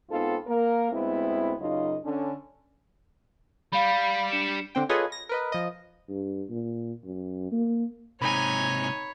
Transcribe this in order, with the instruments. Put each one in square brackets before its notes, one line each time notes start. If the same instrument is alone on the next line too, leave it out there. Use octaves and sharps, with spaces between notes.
[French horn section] G#2 B3 C4 D#4 F4 A4
A#3 A#4
D2 G#3 B3 C4 E4
F#2 C#3 F#3 D#4 F4 D#5
D3 C#4
[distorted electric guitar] G3 [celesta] F5 B5
[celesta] D4 C#7 E7
[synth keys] D3 C4 G5
F4 G#4 A4 B4 C#5 D#5
A#6
A#4 B4 D#5
F3 D#5
[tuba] G2
A#2
F#2
A#3
[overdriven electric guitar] G#2 C3 [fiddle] D#4 G#5 [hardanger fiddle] C#5 [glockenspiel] B5 B6